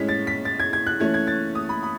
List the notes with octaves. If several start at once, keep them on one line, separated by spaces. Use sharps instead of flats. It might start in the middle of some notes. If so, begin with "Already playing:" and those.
Already playing: A2 G#3 C#4 B6
A6
B6
A6
G#6
G#6
F#6
E3 A3 C#4 G#6
G#6
A6
D#6
B5
B5